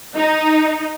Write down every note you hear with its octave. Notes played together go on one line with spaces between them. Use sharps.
D#4